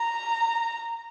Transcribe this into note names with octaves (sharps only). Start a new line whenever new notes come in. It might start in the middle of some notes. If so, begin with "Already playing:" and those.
Already playing: A#5